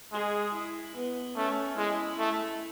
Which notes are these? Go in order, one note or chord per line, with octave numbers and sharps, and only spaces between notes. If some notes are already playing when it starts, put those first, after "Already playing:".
G#3 G#4
E4
B3
A3 C#4
G#3 E4
A3